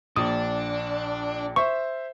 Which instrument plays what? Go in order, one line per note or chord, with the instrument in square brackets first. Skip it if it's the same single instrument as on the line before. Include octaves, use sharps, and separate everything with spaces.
[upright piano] A#1 [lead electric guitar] D4 [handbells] D#6
[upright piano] C5 E5 [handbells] C#6